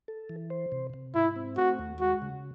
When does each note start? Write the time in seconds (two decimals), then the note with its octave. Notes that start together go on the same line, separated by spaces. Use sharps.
0.08 A4
0.29 E3
0.50 C5
0.72 C3
0.94 C3
1.15 G#2 E4
1.36 C4
1.57 A3 F#4
1.79 D#2
2.00 G#3 F#4
2.22 C#3